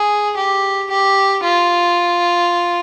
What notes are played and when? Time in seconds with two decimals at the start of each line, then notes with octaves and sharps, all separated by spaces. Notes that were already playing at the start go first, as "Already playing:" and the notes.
Already playing: G#4
0.37 G4
0.91 G4
1.44 F4